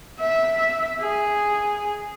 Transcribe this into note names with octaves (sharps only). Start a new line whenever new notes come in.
E5
G#4